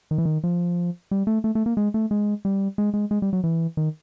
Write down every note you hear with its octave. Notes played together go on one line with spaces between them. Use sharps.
D#3
E3
D#3
F3
G3
A3
A3
A3
A#3
G#3
A3
G#3
G3
G#3
G#3
G#3
G3
F#3
E3
D#3